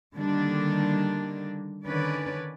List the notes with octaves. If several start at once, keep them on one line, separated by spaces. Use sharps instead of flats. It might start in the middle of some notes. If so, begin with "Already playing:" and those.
D3 D#3 G3 A#3 D4
D3 D#3 C#4 B4 D5